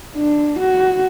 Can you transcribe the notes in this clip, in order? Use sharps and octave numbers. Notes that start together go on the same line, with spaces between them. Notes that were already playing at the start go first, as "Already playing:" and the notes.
D4
F#4